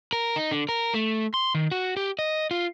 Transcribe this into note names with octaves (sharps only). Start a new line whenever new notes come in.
A#4
D#4
D3
A#4
A3
C6
D#3
F#4
G4
D#5
F4